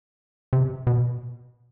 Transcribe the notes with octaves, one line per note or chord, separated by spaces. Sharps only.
C3
B2